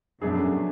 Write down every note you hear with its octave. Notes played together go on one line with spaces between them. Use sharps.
F#2 B2 A3 D4 G#4